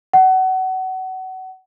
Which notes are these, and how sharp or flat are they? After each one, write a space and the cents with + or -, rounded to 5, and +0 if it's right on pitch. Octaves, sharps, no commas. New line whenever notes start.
F#5 +25